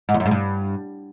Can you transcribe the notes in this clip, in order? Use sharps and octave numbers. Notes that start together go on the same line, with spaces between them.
G#2
E2
F#2
G#2
G2